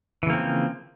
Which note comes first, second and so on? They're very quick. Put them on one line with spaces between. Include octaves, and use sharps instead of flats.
E3 C#3 A#3 C4 F3